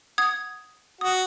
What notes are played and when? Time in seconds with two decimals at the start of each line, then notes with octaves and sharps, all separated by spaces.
0.18 F#5 D#6 G#6
1.01 F#4 D#6